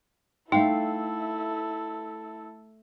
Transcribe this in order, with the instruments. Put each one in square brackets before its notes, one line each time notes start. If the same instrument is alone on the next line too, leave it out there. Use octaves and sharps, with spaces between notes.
[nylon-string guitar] A3 F5 G5 [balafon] D#4 [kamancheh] E4 A4